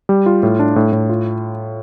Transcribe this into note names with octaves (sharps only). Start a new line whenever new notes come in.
G3
F4
A2
D4
A2
A2
F4